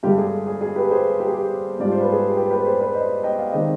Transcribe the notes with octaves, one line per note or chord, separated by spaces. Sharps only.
G2 D3 G#3 G4
G#4
G#4
G#4
G4 B4
G#4 C5
G4
G#4
G4
G#2 G3 D4 F4 D5
C5
B4
G#4
G4
G4 B4
G4 B4
G#4 C5
B4 D5
C5 D#5
D#5 G5
D5 F5
D#3 G#3 C4 C5 D#5